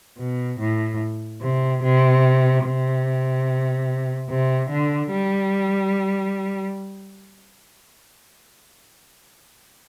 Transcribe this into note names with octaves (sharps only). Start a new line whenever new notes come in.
B2
A2
C3
C3
C3
C3
D3
G3